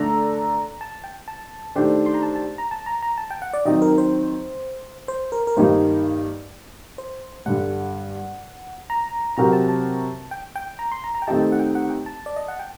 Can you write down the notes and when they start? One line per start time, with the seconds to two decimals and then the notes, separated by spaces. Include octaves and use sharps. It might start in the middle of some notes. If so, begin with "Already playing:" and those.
Already playing: D3 A3 D4 A4 D5 A#5
0.81 A5
1.04 G5
1.28 A5
1.75 D#3 A3 D4 G4 C5
2.06 C6
2.14 A#5
2.22 A5
2.36 A5
2.58 A#5
2.71 A5
2.86 A#5
3.02 A#5
3.18 A5
3.30 G5
3.42 F#5
3.53 D5
3.65 D#3 F#3 C4 D#4 D#5
3.82 A#4
3.98 C5
5.08 C5
5.32 A#4
5.47 A#4
5.57 G2 D#3 G3 A#3 D#4 C5
6.98 C5
7.46 G2 D3 G3 F#5
8.90 A#5
9.37 C3 F#3 C4 F#4 A#4 A#5
9.53 A5
9.68 A5
10.31 G5
10.56 G5
10.79 A#5
10.92 C6
11.04 A#5
11.15 A#5
11.22 G5
11.27 D#3 A3 C4 D#4 G4 A5
11.43 G5
11.52 F#5
11.59 G5
11.75 F#5
11.90 G5
12.06 A5
12.26 D5
12.36 D#5
12.48 F#5
12.60 G5